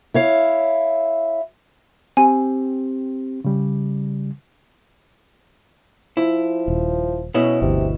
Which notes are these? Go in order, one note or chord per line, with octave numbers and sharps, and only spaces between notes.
E4 C#5 F5
C4 G4 G#5
C#3 G3
F3 E4
D#1
B2 C#4 E4
G1 D2 C3